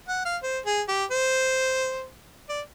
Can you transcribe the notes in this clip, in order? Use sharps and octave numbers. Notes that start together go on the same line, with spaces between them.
F#5
F5
C5
G#4
G4
C5
D5